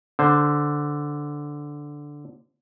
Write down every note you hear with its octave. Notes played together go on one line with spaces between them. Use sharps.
D3 C5